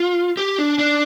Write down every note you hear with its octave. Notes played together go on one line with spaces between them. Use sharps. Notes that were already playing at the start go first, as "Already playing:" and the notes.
Already playing: F4
G4
D4
D4